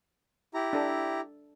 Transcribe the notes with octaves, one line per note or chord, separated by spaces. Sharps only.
E4 G4 A#5
D4 A4